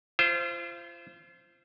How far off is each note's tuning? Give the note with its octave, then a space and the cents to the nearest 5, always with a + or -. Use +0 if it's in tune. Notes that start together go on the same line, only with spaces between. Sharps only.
F4 -35 C5 +0